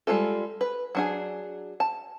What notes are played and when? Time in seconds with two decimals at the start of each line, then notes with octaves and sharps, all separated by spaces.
0.07 G3 G#3 D#4 F4 A4
0.61 B4
0.95 F#3 D4 G#4
1.80 A5